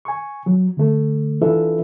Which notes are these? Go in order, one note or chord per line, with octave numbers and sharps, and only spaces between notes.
G#5 C#6
F#3
D3 A3
E3 D4 F4 A4 B4 E5